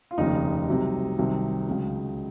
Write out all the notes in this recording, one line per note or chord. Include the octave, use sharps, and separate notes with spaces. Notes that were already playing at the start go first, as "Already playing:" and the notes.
F4
F1 D#2 C#3 D#4
C2 C3 F#3
C2 C3 D#3 F#3
C#2 C#3 F#3